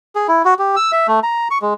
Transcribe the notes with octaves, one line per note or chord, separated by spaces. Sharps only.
G#4
E4
F#4
G4
E6
E5
A3
A#5
C#6
G#3